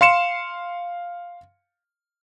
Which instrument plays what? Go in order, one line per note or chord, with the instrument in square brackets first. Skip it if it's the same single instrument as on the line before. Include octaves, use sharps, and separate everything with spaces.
[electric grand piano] F5 C6 C#7 E7